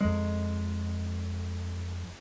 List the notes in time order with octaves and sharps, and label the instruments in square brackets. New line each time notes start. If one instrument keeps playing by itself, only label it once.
[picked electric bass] F2 G#3